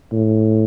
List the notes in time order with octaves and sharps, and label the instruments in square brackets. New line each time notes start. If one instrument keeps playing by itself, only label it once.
[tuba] A2